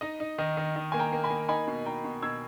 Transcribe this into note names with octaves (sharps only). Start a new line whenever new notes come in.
D#4 D#5
D#4
D#3 D#5
D#3
D#3
A#3 G#5
G5 A#5
A#3
G#5 B5
A#3
D#4 G#5 B5
B2
D#4 G5 A#5
B2
B2 E6 G#6